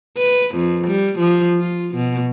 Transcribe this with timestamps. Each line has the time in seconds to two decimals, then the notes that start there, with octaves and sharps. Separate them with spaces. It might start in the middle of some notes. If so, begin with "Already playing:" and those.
0.17 B4
0.55 F2
0.87 G3
1.19 F3
1.59 F4
1.95 B2